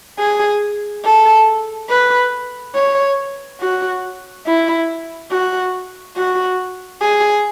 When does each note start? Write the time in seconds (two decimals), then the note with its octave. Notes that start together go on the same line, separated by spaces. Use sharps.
0.19 G#4
1.05 A4
1.90 B4
2.75 C#5
3.61 F#4
4.47 E4
5.31 F#4
6.16 F#4
7.02 G#4